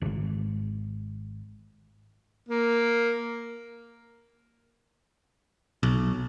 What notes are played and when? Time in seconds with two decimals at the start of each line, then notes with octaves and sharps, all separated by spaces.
0.01 D1 G#1
2.49 A#3
5.83 B1